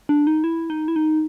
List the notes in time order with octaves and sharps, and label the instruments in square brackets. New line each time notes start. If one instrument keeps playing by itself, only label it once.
[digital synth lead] D4
D#4
E4
D#4
E4
D#4